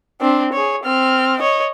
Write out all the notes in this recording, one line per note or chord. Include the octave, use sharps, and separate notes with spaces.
C4 D4
G#4 C#5
C4 F6
C#5 D#5